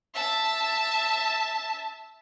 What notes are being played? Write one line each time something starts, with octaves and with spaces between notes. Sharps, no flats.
E5 A5